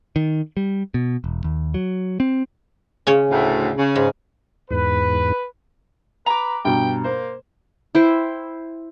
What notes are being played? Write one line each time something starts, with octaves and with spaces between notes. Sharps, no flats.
D#3
G3
B2
E1
D#2
F#3
C4
C#3 C#4 C#5
D2 A2
C#3
G#2
E2 G#2 B4
B4 A#5 D6
G2 B2 G5
A#3 C5
E4 C5 G5